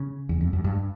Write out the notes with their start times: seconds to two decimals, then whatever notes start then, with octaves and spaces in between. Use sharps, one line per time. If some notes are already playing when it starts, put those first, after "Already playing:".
Already playing: C#3
0.29 E2
0.41 F2
0.53 F#2
0.64 G2